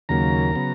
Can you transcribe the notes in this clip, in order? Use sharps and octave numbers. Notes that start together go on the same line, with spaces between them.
D#2 C#3 F#3 A#3 A#5
C#3 F#3 B3